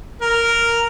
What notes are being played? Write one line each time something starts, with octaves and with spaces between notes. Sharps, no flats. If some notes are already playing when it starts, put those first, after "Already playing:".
A#4